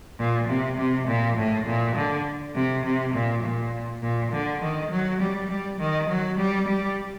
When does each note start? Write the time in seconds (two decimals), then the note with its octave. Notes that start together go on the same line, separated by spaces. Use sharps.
0.19 A#2
0.48 C3
0.78 C3
1.07 A#2
1.36 A2
1.66 A#2
1.96 D3
2.55 C3
2.84 C3
3.14 A#2
3.43 A#2
4.02 A#2
4.32 D3
4.62 D#3
4.91 F#3
5.21 G3
5.50 G3
5.80 D#3
6.09 F#3
6.38 G3
6.68 G3